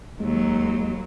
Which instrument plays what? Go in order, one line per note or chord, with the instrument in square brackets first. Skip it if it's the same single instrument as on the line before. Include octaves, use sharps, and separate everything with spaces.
[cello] D#2 F#3 [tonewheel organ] G#3